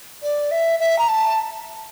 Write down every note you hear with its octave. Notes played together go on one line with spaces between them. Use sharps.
D5
E5
E5
A#5
A5